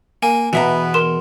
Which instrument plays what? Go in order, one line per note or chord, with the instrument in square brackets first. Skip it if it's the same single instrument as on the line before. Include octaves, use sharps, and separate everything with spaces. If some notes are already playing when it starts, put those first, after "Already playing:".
[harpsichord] A#3 [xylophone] G#5
[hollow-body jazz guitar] E2 E5 A#5 [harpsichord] B2 [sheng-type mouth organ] B3 B4
[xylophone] A#4 C6 E7